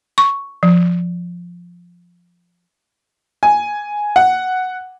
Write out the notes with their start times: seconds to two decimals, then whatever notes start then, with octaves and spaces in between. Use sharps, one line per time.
0.18 C#6
0.63 F3
3.43 G#5
4.16 F#5